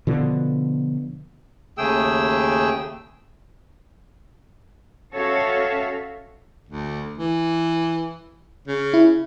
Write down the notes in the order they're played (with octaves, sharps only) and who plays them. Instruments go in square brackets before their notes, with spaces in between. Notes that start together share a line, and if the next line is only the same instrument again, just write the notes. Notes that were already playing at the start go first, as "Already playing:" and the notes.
[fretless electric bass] B2 D3 F3
[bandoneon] D#2 C#3 A3 G#4 G5 E6
[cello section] C#4 F#4 A4 C#5 E5 F5
[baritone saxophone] D2
E3
C#3
[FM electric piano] E4